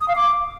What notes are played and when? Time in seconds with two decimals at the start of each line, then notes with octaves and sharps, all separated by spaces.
0.01 D#6
0.08 F5
0.16 D6